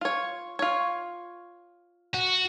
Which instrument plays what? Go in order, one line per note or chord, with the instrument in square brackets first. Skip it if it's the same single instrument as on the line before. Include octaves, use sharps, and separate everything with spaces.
[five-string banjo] F4 C#5
F4 C#5
[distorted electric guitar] F#4